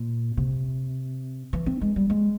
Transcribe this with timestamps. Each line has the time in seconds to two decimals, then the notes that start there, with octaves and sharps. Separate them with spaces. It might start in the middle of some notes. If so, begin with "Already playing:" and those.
Already playing: A#2
0.37 C3
1.53 E3
1.66 C4
1.81 G#3
1.96 G3
2.10 G#3